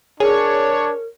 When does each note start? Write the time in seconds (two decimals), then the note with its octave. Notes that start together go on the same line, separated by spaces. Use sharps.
0.20 D4 G#4 A#4 C#5